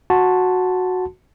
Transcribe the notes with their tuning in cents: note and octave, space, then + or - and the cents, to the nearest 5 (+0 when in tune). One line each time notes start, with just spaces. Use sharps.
F#4 -10 A5 +0 C6 -10